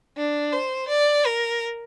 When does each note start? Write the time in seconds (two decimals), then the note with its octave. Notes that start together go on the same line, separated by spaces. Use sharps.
0.17 D4
0.53 C5
0.88 D5
1.25 A#4